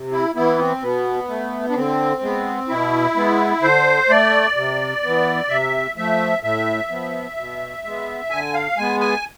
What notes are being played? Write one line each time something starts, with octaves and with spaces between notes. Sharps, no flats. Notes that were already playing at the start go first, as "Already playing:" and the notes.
Already playing: C3
E4
E3 B3 E4
C4
B2 B3
A3
D4
D3 C4
G#3 B3
B2 E4
G#3 B3
D3 C5
A3 D5
C3
E3 B3
C3 E5
F3 A3 E5
A2 E5
F3 B3
B2
G#3 B3
D3 G#5
F5
G#3 B3 G#5
G#5